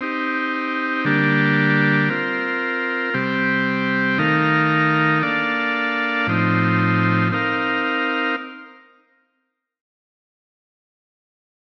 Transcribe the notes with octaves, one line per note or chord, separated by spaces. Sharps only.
C4 D#4 G4
D3 G3 A#3 D4 G4
C4 F4 A#4
C3 G3 C4 G4
D#3 A3 D#4 A#4 F5
A#3 D4 A4 D5 F5
A2 F3 C4 D#4
C4 D#4 A#4 F5